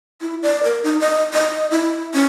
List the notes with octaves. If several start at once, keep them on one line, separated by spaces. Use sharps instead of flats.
E4
D5
A#4
D#4
D#5
D#5
E4
C#4